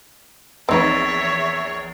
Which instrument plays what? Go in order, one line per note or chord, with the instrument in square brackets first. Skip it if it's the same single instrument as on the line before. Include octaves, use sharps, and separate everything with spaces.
[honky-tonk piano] A#1 E2 [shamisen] C4 D#4 B4 [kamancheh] C#5 [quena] E5